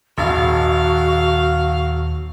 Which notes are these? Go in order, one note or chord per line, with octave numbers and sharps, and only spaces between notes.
G#1 D#2 A#2 D#3 F#4 F5